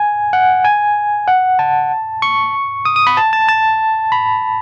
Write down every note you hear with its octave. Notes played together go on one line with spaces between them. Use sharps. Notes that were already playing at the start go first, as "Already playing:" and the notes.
Already playing: G#5
F#5
G#5
F#5
A5
C#6
D#6
D#6
B5
A5
A5
A5
B5